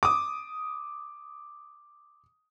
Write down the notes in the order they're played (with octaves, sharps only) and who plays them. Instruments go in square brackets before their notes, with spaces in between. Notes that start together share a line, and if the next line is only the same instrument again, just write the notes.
[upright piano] D6 D#6